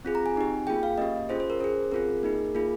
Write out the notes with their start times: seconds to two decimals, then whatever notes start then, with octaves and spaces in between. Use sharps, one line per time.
0.05 C4 F4 G#4
0.15 A#5
0.26 G#5
0.36 C4 D#4 G4
0.67 A#3 F4 G#4 G5
0.83 F5
0.98 A#3 C#4 G4 D#5
1.29 C#4 F4 G#4 C5
1.40 C5
1.50 A#4
1.60 C#4 G#4 C5
1.92 C4 F4 G#4 A#4
2.23 A#3 D#4 G#4
2.55 A#3 F4 G#4